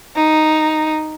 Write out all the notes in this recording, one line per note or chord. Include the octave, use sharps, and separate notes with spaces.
D#4